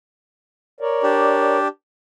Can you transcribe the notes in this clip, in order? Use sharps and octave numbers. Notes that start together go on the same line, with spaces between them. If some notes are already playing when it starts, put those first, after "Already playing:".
A#4 C#5 D5
D4 G4